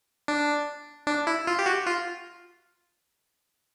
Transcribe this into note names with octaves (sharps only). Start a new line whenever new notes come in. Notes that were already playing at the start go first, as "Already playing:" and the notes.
D4
D4
E4
F4
G4
F#4
F4